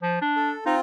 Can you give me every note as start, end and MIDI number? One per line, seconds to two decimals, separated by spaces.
0.03 0.18 53
0.21 0.53 62
0.36 0.64 69
0.66 0.81 60
0.66 0.76 63
0.66 0.81 65